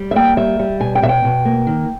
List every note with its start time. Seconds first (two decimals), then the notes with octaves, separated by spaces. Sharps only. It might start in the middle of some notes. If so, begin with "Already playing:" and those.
Already playing: G3
0.11 E5
0.16 A#3 G5
0.37 G3 E5
0.59 G3
0.80 B2 G#5
0.95 G5
1.02 B2 E5
1.09 G5
1.24 B2
1.45 A#3
1.67 D#3